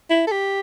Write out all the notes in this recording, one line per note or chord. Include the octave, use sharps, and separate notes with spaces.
E4
A4
G4